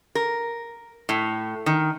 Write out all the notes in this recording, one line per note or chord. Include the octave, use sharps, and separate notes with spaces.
A#4
A2
D#3